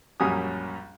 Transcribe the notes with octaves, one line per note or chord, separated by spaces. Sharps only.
A#1 F#2 G3 C#4 G#5 D#6